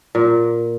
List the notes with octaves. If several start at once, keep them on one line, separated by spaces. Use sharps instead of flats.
A#2